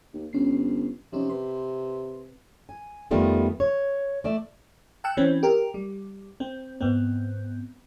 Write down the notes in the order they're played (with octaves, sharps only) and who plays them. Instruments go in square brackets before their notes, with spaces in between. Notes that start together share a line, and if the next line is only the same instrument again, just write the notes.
[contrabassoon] D#2
[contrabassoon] G1 [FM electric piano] C#4 C7
[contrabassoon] C3 [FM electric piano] F3 C#4 D#4
[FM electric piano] B4 C6
[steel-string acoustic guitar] G#5
F2 D#3 G3 A3 B3 F4
C#5
A3 D5 E5
[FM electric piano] G5 A5 E6 F#6 C#7
E3 C4 C#4
G4 A#4
G3
C4
G#2 B3 C4